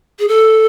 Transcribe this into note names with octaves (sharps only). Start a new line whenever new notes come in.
G#4
A4